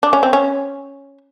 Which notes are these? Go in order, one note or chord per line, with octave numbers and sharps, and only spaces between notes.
D4
C#4
C4
C#4